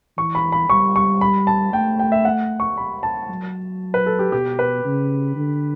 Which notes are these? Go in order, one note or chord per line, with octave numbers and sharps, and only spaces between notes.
E3 C#6
B5
B5
G3 C#6
C#6
B5
A5
A3 G5
G5
E5
F#5
C#6
B5
A5
F#3
B4
A4
G4
B2 G4
B4
C#3
D3